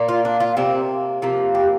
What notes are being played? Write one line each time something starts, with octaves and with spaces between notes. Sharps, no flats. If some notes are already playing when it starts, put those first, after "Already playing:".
Already playing: A#2 A#3
F4
D4
F4
C3 A#3 C4
C3 F3 A#3
G4